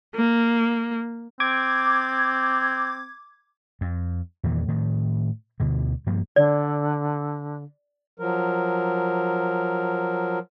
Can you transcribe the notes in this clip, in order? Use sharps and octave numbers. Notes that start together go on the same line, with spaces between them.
A#3
C4 D6 G#6
F2
E2 A#2 D#3 E3
A2 D#3
D2 B2 D3
G2 F3 A#3
D3 D5
F3 F#3 A#4